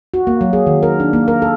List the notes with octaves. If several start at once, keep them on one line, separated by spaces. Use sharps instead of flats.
F#4
A#3
F#3
G#4
D#3
A#4
D4
A#3
A#4
A4